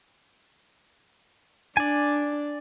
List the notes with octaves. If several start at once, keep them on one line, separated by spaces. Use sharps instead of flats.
D4 D5 G#5